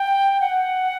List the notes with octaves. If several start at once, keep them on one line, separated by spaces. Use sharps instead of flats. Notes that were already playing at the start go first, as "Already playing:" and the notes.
Already playing: G5
F#5